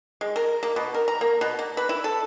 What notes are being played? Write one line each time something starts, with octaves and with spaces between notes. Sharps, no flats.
G#3
A#4
A#3
B2
A#4
A#5
A#3
B2
A#3
B4
E4
A4